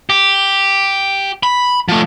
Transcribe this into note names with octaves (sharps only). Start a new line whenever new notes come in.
G4
B5
F3 A3